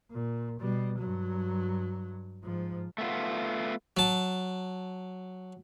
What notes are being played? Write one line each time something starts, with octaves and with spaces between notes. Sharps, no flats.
A#2
B2 G3
G2 F#3
G#2 F3
A3 B3 F4
F#3 A5